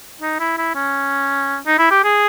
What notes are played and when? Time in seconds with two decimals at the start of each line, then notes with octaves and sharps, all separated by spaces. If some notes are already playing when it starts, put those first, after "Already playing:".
0.21 D#4
0.40 E4
0.58 E4
0.75 C#4
1.67 D#4
1.79 E4
1.91 G4
2.04 G#4